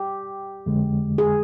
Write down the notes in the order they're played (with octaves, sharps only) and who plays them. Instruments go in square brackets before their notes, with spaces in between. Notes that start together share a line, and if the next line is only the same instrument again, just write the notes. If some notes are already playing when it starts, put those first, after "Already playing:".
Already playing: [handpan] G4
[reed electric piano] F2 D3 G#3
[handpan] G#4